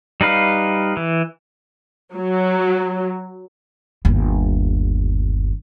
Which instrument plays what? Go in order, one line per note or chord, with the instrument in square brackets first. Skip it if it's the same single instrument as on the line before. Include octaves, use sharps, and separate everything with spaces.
[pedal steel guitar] G3 D#4 B4 F5
E3
[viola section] F#3
[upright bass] G1 D#2